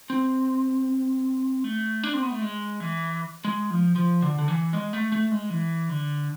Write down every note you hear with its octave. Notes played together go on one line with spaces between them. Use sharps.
C4
A3
D4
C4
B3
A3
G#3
E3
G#3
F3
F3
D3
D3
E3
G#3
A3
A3
G#3
E3
D3